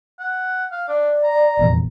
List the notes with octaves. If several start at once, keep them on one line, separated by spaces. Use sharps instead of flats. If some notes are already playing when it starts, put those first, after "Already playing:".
F#5
F5
D4 D5
A#5
F1 A#1 E2